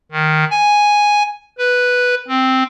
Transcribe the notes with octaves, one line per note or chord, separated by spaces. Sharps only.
D#3
G#5
B4
C4